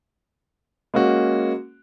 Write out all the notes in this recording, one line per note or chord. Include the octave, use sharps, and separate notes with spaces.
G#3 A#3 C#4 F#4